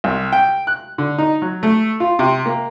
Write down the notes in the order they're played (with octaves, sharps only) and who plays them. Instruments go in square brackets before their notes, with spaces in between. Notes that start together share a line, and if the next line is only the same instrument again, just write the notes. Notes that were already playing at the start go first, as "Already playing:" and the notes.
[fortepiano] C2
G5
F#6
D3
D#4
F#3
A3
F4
C3
A#3